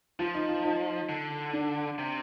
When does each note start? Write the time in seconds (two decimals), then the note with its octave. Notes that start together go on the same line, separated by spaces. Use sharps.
0.19 F3 F4
0.35 D#4
0.49 F4
0.65 D#4
1.09 D3
1.53 D4
1.98 C3